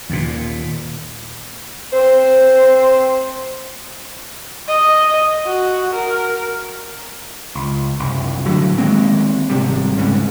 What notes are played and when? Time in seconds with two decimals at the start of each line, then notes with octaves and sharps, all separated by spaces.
0.10 D#2 A#2
1.92 C4 C5
4.68 D#5
5.46 F#4
5.93 A#4
7.55 C#2
8.00 F#1 C2
8.46 A2 D3 F#3
8.78 D#3 G#3 A#3 C4
9.50 G#1 C3 G3
9.97 D#1 B1 G#2 C#3